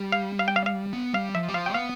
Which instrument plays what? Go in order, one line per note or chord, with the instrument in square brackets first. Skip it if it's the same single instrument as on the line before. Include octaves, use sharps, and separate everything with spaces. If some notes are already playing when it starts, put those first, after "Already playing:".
Already playing: [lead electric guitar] G3
[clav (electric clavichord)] F5
F5
G5
F5
F5
[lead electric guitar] B3
[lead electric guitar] G3 [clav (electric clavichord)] F5
[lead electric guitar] F3 [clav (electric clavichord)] E5
[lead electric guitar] G3
[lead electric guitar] F3 [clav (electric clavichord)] F5
[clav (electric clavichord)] G5
[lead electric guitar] B3 [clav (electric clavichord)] F5